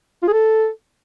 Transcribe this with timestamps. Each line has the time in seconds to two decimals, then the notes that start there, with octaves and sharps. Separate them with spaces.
0.23 F4
0.28 G#4
0.33 A4